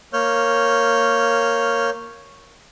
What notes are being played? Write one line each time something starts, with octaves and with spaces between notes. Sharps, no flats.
A#3 C#5 F6 G6